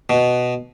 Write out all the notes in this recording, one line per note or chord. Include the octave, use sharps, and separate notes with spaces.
B2